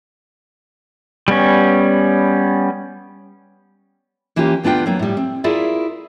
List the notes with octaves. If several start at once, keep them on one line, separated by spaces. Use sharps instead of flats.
G3 B3 C#4
E3 A#3 C#4 F4 G4
D2 B3 D4 F4 G5
F#3 A#3 B3
A2 G3
C4
E4 F4 G#4 A#4 D5 E5